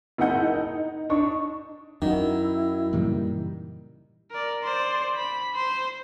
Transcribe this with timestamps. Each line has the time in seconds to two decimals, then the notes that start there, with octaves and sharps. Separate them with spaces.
0.18 F#1 D#4 E4 F#5 G6
0.54 D#4
1.10 D4 D#4 C#6
2.02 F#2 D#3 D#4 E4 F#4
2.93 F#2 A#2 C#3 E3 G3
4.31 A#4 D5
4.62 C5 D5
5.16 B5
5.55 C5